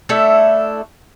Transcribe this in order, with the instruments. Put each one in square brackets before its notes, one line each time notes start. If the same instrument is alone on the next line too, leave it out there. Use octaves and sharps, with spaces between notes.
[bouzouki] A3 D4 E4 A4